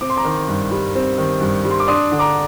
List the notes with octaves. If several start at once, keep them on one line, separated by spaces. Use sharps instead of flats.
C4 D6
C6
A#5 D6
D#3
G2
G3
C4
D#3
G2
G3
C6
D6
D4 C6 D#6
D3
A#5 D6